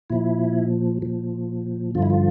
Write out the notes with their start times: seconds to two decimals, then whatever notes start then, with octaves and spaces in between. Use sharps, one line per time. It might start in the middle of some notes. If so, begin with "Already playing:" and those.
0.10 A#2 F3 E4
1.02 A#2 F3
1.95 G2 D3 F3 F4
2.02 E4
2.10 F4